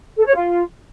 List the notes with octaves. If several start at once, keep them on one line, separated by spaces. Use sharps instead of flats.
A4
C#5
F4